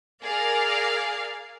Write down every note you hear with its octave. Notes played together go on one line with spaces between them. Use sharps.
G#4 A#4 D5 F5